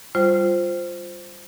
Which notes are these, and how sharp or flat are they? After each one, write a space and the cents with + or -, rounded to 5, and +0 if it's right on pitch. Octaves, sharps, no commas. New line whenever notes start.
G3 +0 F4 +0 C5 +0